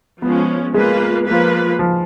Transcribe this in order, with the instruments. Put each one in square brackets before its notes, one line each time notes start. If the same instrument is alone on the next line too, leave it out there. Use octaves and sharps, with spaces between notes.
[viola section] F3 G#3 C#4 [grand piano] B3
[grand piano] G#3 [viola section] A#3 F4 B4
[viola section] F3 A#3 F4 B4
[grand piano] F3